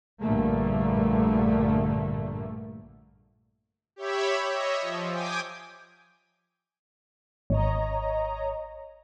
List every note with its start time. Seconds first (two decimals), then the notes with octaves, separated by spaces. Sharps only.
0.21 A#1 G2 A#2 D3 A3 A#3
3.96 G4 C#5 E5 B5
4.52 C#5 D#5 E5
4.81 F3
5.10 G5 G#5 D6 D#6
7.50 G#1 C#5 D#5 A#5